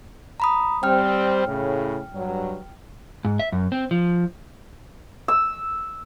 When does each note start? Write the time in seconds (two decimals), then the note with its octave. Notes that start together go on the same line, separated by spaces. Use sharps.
0.40 A#5 B5 D#6
0.83 G3 C4 G5 F6
1.47 A2 C#3
2.13 G2 F#3
3.25 G#2
3.39 E5
3.52 F#2
3.72 C4
3.91 F3
5.28 E6